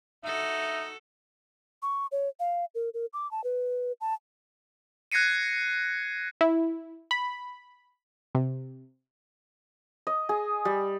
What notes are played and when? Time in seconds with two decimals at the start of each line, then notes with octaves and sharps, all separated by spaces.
0.24 D#4 F#4 A4 E5
1.82 C#6
2.12 C#5
2.40 F5
2.75 A#4
2.94 A#4
3.13 D6
3.31 A5
3.44 B4
4.01 A5
5.12 F#6 G#6 A#6 C7 C#7 D#7
6.41 E4
7.11 B5
8.35 C3
10.07 D#5
10.29 G#4
10.65 G3